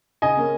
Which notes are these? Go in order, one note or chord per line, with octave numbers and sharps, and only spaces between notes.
C#3 D#5 G#5
A#3 C#4